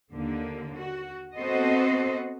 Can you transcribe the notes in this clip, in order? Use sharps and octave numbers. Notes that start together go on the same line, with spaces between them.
D#2 D3 A#3
F#4
B3 C4 F#4 A4 C5 D#5